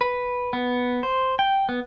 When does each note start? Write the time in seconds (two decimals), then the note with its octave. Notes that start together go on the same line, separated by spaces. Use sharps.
0.01 B4
0.53 B3
1.03 C5
1.39 G5
1.69 B3